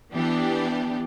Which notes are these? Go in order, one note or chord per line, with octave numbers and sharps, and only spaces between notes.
E3 B3 D4 G4